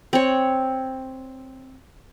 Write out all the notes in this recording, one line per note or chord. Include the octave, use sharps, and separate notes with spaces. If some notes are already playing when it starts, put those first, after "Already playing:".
C4 C#5